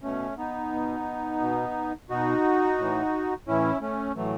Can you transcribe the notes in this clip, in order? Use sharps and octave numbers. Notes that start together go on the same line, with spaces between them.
B2 A3 C#4
B3 D#4
B2
B2
B2 D#4 F#4
A2 E3
A2 E3 C#4 E4
A3 C#4
A2 E3 F#3 A3